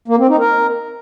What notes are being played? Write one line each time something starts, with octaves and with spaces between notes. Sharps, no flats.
A#3
C4
D#4
A#4